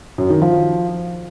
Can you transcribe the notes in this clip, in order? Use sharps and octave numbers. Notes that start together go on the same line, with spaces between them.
F#2
D#3
F3